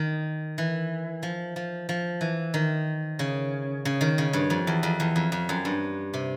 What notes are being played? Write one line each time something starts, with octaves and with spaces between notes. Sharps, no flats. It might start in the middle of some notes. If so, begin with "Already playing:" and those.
Already playing: D#3
E3
F3
F3
F3
E3
D#3
C#3
C#3
D#3
C#3
G2
F2
E2
F2
E2
F2
F2
F#2
G2
C3